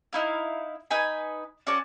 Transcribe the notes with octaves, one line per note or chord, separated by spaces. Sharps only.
D#4 E4 F5
D#4 B4 G#5 B5
C#4 F#4 D5 A5